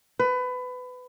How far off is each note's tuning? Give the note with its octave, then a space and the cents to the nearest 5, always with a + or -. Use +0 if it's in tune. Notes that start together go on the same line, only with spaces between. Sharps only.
B4 +25